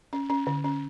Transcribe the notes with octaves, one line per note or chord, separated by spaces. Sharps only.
C#4
C#4
D3
C#4